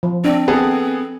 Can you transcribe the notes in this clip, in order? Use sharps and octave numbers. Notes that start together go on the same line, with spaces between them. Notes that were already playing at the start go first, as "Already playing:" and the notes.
F3
C4 D4
B3 G#4 A4